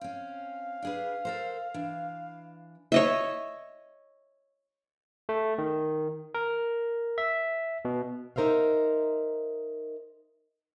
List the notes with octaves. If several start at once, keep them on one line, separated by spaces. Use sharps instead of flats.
C4 C#4 F5
D4 G#4 B4
A4 A#4 C5
E3 D4
C#5 D#5 E5
A3
D#3
A#4
E5
B2
D#4 A#4 C5 E5 F5